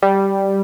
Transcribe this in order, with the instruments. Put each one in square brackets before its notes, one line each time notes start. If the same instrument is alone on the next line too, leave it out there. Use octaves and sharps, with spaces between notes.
[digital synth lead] G3